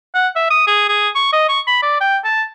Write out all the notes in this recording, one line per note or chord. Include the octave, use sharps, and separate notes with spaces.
F#5
E5
D#6
G#4
G#4
C#6
D#5
C#6
B5
D5
G5
A5